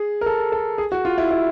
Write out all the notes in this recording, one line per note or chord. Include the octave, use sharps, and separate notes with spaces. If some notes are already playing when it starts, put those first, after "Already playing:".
Already playing: G#4
A#4
A4
A4
G#4
F#4
F4
E4
E4